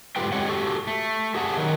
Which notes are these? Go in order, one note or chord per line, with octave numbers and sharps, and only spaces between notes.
G#2 A3 F4 G4 B4 G5
D3 G#3 C4 G4 C#5 F#5
F#4 G4 A4
A3
G4 G#4 F#5 G#5 A5
D#3 F#3